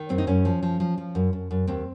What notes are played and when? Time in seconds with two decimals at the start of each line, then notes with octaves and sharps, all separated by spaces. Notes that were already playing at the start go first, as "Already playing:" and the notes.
Already playing: D#3
0.09 F#2 C4
0.18 D#4
0.27 F#2 C#4
0.45 F3
0.63 F3
0.80 F3
0.98 F3
1.15 F#2
1.33 F#2
1.51 F#2
1.67 D#2 C4